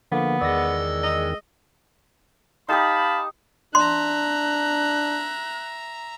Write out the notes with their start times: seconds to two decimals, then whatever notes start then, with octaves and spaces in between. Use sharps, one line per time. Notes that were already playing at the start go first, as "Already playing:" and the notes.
0.12 D3 F3 A#3 B3
0.41 E2 D#3 G#3 D5 E6 A#6
1.03 D#5
2.69 D#4 G4 F5 A5 B5 D#6
3.75 D4 E5 A#5 C6 F#6